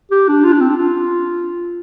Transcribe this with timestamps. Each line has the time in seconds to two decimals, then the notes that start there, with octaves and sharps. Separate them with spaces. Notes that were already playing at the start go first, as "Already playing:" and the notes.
0.12 G4
0.29 D4
0.44 F4
0.53 D4
0.61 C4
0.70 D4
0.78 F4